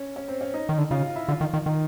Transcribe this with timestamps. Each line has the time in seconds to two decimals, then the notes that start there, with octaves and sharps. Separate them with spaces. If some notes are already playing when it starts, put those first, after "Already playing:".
Already playing: C#4
0.16 C#4
0.28 C4
0.41 C#4
0.54 D#4
0.69 D#3
0.78 D3
0.91 C#3 F4
1.03 F4
1.16 E4
1.28 D3 F4
1.41 D#3
1.53 D#3
1.66 D#3